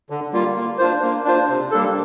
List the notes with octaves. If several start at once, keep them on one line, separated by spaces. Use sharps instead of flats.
D3
G3 A#3 F4
A#3
D4 F4 C5
A#3
D4 F4 C5
C3
G3 A#3 D4 A4